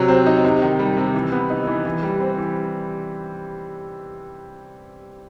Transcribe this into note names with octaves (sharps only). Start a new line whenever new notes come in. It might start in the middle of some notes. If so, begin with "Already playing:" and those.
Already playing: C3 F#3
C4
D#4
C3
D#3
G3
C3
E3
B3
D#4
E3
E3
G3
C4
E3